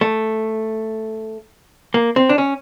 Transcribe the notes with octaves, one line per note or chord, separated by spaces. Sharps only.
A3
A#3
C4
D4
C#4